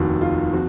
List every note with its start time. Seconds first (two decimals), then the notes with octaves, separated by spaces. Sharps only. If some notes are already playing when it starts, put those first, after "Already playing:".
Already playing: F1 D#2 D#3 F#4
0.21 F4
0.53 F3 C4 F#4